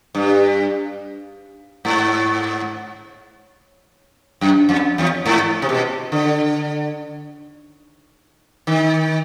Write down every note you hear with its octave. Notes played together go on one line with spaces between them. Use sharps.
G2
G#2
F#2
F2
E2
G#2
C3
B2
D3
D#3